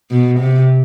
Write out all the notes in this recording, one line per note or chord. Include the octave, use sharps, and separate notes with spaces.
B2
C3